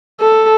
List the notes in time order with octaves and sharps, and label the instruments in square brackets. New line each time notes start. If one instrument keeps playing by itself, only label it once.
[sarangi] A4